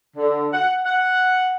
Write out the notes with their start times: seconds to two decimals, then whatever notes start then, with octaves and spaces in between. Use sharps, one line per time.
0.17 D3
0.53 F#5
0.84 F#5